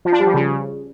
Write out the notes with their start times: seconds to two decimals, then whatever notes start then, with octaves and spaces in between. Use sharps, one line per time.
0.05 F3
0.12 D4
0.20 G3
0.27 F3
0.34 C#3